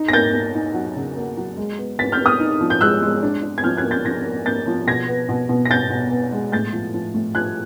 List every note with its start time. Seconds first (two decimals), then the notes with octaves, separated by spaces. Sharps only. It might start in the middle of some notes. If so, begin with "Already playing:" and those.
Already playing: D#4
0.08 A#6
0.13 A#3 G6 A6
0.33 A#3
0.55 D#4
0.74 F#3
0.96 C#3
1.17 A#3
1.37 F#3
1.57 G#3
1.78 B3
1.99 B3 A6 B6
2.12 F6 G6
2.19 B3
2.26 D#6 F6
2.40 D#4
2.61 F3
2.70 G6
2.81 G#3 E6 F#6
3.02 G#3
3.23 D4
3.43 D4
3.58 G#6
3.63 F3 F6 G6
3.77 F#6 G#6
3.84 A#3
3.91 G6 A6
4.05 F3 G#6 A#6
4.26 A#3
4.46 A#3 G6 A6
4.67 F3
4.87 B2 G#6 A#6
5.08 B3
5.29 B2
5.49 B2
5.65 A#6
5.70 B2 G6 A6
5.90 B2
6.11 B3
6.32 G#3
6.52 A2 G6 A6
6.73 F3
6.94 F3
7.14 A2
7.35 F3 F#6 G#6